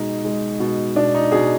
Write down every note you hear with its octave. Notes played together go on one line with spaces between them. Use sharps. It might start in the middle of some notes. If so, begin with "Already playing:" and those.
Already playing: B2 G#3 D#4
G#3
B2
B2 D4
D#4
B2 G#4